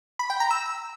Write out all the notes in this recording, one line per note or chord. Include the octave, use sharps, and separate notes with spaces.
B5
G5
A#5
E6